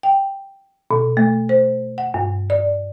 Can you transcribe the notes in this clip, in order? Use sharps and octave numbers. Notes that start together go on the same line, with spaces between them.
G5
B2
A3
C5
F#5
G2
D5